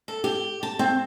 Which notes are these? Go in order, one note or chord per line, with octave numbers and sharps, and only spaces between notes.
A4
G4
A5
C4